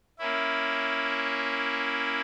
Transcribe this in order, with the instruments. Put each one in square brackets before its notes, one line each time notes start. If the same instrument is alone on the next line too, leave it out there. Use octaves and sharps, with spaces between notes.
[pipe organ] A#3 C#4 E4